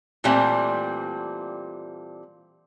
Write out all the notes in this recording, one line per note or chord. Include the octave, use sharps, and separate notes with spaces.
A#2 E3 G3 A3 C4